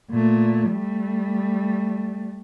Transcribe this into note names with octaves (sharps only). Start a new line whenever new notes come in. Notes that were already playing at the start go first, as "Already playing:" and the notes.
A#2 A3
G3 A3